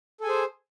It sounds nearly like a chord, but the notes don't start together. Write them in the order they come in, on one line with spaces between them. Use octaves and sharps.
A4 G#5 G#4 C5